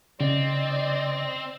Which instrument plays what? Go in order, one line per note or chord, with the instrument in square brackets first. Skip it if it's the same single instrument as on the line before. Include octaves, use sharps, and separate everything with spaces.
[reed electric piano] C#3 [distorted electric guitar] C4 [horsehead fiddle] D5 D#5